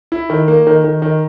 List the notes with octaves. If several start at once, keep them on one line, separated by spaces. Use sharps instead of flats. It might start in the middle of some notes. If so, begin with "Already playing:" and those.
E4
D#3
A#3
D#3
D#3
D#3